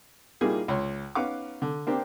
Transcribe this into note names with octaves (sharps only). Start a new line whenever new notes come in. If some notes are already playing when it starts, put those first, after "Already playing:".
A#2 G3 A#3 D#4 E4 G#4
C#2 C#5 C6
B3 C#4 D#4 F5 F#5 D6
D3
A#3 C4 D4 G4